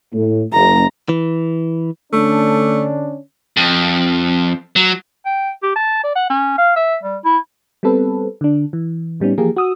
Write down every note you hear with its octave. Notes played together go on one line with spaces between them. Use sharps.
A2
F#1 A#5
E3
D3 A3 C#4 D4
F2
F#3
G5
G4
A5
D5
F#5
C#4
F5
E5
G3
E4
G3 B3 C4 A4 B4
D3 D4
E3
A2 G3 B3 C#4 D#4
E3 F3 A#3 G4 G#4 A#4
F#4 D#6 E6